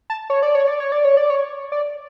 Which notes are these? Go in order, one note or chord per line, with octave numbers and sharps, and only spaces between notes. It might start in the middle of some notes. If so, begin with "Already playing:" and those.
A5
C#5
D5
C#5
D5
C#5
D5
C#5
D5
C#5
D5